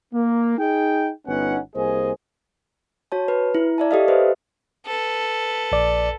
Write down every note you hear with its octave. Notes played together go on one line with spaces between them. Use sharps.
A#3
D#4 G#4 G5
G1 B3 C#4 D#4 F#5
C2 A#3 G#4 C5 D#5 G#5
F#4 C#5 A5
B4
E4
D5 E5 A5
G4 A4 D#5 F5
B4 C5 D#5 E5
A4 B4
A#1 D5